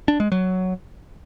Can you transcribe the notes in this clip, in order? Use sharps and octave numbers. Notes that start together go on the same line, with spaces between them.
D4
G#3
F#3